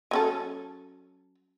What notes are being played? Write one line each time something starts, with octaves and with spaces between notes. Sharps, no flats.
F#3 C#4 A4